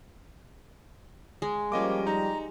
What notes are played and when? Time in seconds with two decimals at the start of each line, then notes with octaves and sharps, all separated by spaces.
1.42 G#3
1.72 F3 G3 A#3 C#4 D#5 D6
2.07 D#4 A#5